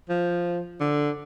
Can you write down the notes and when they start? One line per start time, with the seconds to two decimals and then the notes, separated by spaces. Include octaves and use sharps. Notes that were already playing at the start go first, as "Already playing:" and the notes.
0.09 F3
0.80 D3